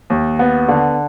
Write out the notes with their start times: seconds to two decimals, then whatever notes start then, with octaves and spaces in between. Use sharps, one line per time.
0.10 D#2
0.39 B3
0.68 D3